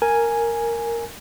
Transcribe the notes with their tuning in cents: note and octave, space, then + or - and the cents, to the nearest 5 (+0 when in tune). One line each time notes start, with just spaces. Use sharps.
A#4 -5 G#5 +0